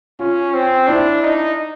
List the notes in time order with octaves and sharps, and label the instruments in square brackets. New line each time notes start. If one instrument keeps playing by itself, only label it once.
[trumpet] C#4 [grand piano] F4
[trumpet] C4
[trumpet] D4 [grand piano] E4
[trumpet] D#4